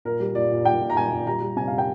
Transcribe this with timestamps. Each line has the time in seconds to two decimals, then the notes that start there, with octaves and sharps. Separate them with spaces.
0.05 A#2 A#4
0.20 G3
0.35 A#2 D5
0.51 A#2
0.65 A#2 G5
0.81 A#2
0.90 A#5
0.97 A#2 G#5
1.11 A#2
1.27 G3 A#5
1.41 G3
1.56 C3 G#5
1.68 C3 F5
1.78 G5